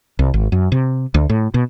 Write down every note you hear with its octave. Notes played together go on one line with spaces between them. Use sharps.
C2
G#1
F#2
C3
D2
A2
B2